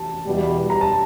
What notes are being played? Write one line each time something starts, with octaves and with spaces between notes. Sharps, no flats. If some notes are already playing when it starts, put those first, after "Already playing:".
Already playing: A5
E2 B2 G3
A#5
A5